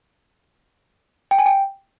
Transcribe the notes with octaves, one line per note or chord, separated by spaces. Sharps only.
G5
G#5
G5